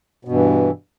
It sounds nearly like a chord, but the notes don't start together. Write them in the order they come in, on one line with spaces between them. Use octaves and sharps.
B2 G2 E3